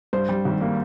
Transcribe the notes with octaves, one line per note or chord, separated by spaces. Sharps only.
G2 C5
G3
G#1
A#3